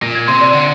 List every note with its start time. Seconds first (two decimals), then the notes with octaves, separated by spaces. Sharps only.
0.02 A#2 A#6
0.15 G#6
0.28 C3 C6
0.41 D5
0.53 D3